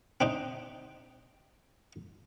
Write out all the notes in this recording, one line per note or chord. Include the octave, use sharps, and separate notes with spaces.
C4 D4 D#4